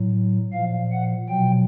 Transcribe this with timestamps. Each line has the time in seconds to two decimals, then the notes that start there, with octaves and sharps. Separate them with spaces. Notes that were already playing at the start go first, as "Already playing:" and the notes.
Already playing: A2 F#3
0.53 A#2 F3 F5
0.92 F#5
1.29 B2 F#3 G5